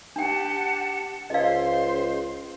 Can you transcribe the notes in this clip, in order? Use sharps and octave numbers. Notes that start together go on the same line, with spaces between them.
D4 G4 F#5 G5 A5
C#2 C5 D#5 F5 C6